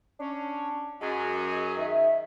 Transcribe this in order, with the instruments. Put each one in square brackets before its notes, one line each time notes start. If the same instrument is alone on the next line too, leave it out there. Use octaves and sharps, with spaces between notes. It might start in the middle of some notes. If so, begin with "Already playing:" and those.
[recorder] C#4 [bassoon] D4
[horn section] F#2 [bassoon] G#3 [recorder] G#4
[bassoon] D#3 [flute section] E5